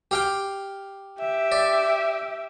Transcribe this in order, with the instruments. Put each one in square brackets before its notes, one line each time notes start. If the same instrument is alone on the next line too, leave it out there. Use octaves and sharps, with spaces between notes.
[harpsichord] G4 F5 G5
[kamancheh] G4 E5
[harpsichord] D5